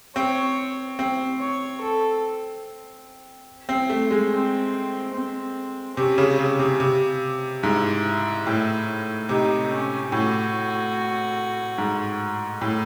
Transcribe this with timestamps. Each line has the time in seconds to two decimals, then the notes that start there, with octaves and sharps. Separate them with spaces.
0.16 C4 C#5
0.99 C4
1.40 C#5
1.81 A4
3.69 C4
3.90 A3
4.11 G#3
4.31 C4
5.14 C4
5.97 C3 C#4
6.18 C#3
6.39 C#3
6.59 C3
6.80 C3
7.63 G#2 E4
8.47 A2
9.29 C3 D#4
9.72 C#4
10.12 A2 F#4
11.78 G#2
12.61 A2